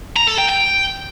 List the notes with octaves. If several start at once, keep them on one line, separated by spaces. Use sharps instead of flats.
A#5
A4
G5
G5